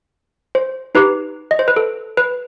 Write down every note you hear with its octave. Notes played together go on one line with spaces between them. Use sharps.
C5
D#4 G4 B4
D#5
C5
B4
A4
B4